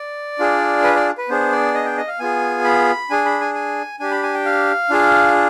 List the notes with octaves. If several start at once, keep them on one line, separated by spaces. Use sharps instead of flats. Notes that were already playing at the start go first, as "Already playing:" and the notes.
Already playing: D5
D4 F4 G#4
B4
D5
B4
B3 D4 G#4 C5
D5
D#5
G5
D#5
F5
B3 F4 G#4 G#5
B5
D4 G#4 G#5
B5
G#5
G#5
D4 G4 G#5
B5
G#5
G5
F5
D4 F4 G#4